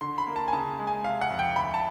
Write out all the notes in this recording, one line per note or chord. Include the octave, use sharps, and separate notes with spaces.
D3 C6
B5
A#3
A5
G#5
C#3 A5
G#3
G#5
C3 F5
F#5
F2
G5
D2 B5
A5